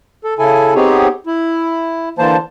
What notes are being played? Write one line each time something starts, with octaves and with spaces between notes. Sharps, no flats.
A4
C#3 E4 A4 G#5
B3 C4 D#4 G4 G#4 C#5
E4
D3 E3 A#3 C5 A5